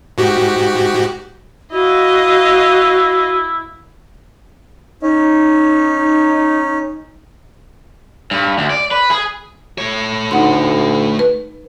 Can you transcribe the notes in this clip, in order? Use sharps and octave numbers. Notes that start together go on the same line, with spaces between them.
G#2 F#4 G4
E4 F#4 D#5 F5
C#4 D#4
G2
D2
D5
B4
G#4
A3 C#5
D2 D#4 F#5 C6
B4